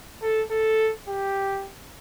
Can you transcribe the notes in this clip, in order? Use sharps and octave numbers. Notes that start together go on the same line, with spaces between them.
A4
A4
G4